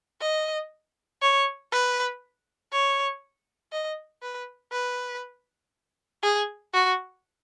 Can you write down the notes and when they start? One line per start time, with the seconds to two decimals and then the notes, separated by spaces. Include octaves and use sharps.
0.21 D#5
1.22 C#5
1.72 B4
2.72 C#5
3.72 D#5
4.22 B4
4.72 B4
6.23 G#4
6.73 F#4